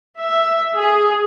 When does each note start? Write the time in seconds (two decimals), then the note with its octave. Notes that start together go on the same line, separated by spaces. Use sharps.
0.20 E5
0.76 G#4